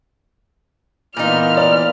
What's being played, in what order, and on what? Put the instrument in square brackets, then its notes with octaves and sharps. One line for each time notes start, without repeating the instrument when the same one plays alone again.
[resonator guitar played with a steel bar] A#2 D#4 [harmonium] E3 A#3 F4 [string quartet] B3 F6
[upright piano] D5